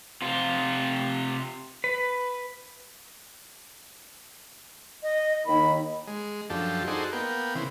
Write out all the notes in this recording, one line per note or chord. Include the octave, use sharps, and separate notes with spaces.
C3 F4
B4
D#5
D#2 D#3 B5
G#3
F#2 F3 D4 G4 A4
D#4 F#4 G#4 A4 C5 D5
A#3 B3 G5
C#3 E3 C4